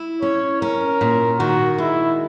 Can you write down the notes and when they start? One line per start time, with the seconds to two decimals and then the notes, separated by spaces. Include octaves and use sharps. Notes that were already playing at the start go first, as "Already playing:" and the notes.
Already playing: E4
0.22 C#4 C#5
0.62 C#4 A#4
1.01 A#2
1.39 D#3 F#4
1.78 G#3 E4